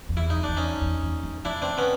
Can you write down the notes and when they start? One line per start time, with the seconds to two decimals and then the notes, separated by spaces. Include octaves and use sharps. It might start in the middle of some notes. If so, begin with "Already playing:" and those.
0.09 F2
0.16 E2 E4
0.30 D#4
0.43 E2 D4
0.57 C#4 D#4
0.81 E2
1.03 E2
1.23 E2
1.45 E2 D4 E4
1.62 C4 D4
1.78 B3 C#4